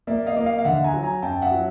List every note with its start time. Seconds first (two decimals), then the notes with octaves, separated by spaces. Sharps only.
0.07 A#3 D5 E5
0.26 D#5 F5
0.37 A#3
0.45 D#5 F5
0.59 F5
0.64 D3 E5 F#5
0.84 G#5 A#5
0.94 F#3
1.03 G#5 A#5
1.22 F#2 G5 A5
1.42 E5 F#5
1.51 F#3